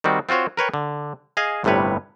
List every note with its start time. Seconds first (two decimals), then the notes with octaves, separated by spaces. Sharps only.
0.04 D#3 G3 C4 F#4
0.29 C4 F4 F#4 C5 C#5
0.57 A#4 B4 C#5 G5
0.74 D3
1.37 G#4 D#5 F5 G#5
1.64 G1 A2 C3 G3 B4 C#5